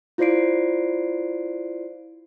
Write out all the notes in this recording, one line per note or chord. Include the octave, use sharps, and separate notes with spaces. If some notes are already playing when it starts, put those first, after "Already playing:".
E4 F4 C5 D5 C7 D7